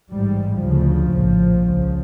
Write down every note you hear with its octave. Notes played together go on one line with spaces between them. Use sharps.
A1 G#2 G3
D2 C#3 F3
A#1 A2
C#2 C#3